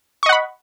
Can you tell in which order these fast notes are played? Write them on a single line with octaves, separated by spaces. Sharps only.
C#6 D#5 F#5 B5